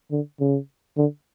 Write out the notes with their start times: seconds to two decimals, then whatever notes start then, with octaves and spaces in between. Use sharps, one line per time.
0.11 D3
0.40 C#3
0.97 D3